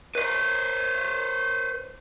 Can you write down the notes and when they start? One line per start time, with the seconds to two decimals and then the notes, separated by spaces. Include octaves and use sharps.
0.15 B4 C5